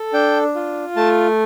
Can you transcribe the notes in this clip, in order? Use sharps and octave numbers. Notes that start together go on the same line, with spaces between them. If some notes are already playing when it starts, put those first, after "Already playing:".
Already playing: A4
D4 G5
F4
A3 A5